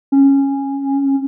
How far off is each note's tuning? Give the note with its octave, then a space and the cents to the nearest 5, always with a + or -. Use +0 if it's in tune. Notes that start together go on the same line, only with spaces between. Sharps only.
C#4 -10